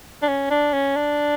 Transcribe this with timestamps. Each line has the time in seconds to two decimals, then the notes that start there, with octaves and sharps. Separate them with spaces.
0.22 D4
0.28 C#4
0.51 D4
0.73 C#4
0.96 D4